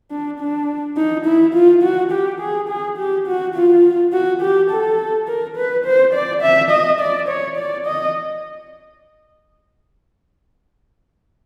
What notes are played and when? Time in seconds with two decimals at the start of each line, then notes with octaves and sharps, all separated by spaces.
0.11 D4
0.39 D4
0.97 D#4
1.26 E4
1.54 F4
1.83 F#4
2.12 G4
2.40 G#4
2.69 G#4
2.98 G4
3.27 F#4
3.55 F4
4.13 F#4
4.42 G4
4.70 A4
5.27 A#4
5.57 B4
5.85 C5
6.13 D5
6.42 E5
6.71 D#5
7.00 D5
7.28 C#5
7.57 D5
7.86 D#5